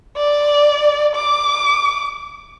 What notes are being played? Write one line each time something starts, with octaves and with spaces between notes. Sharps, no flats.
D5
D6